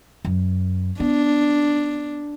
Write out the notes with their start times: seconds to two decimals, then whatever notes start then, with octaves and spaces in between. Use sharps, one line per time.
0.25 F#2
1.00 B3 D4